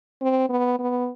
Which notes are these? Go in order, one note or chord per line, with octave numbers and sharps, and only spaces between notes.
C4
B3
B3